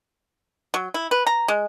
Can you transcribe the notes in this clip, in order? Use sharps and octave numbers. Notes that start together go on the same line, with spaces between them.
F#3
E4
B4
A#5
G#3